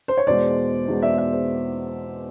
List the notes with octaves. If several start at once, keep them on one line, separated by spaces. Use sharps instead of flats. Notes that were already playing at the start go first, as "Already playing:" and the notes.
C5
C#5
E2 B2 G#3 C5 D5
E2 B2 G#3
D5 E5
D5 E5
C5